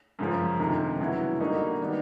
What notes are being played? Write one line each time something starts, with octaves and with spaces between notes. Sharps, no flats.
F#2 C#3 F3
D2 C3 D#3
C#3 F#3 B3 E4
D3 G3 A#3 D#4 F#4
D#3 G3 B3 D#4